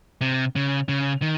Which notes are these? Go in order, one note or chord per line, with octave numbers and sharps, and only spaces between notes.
C3
C#3
C#3
D#3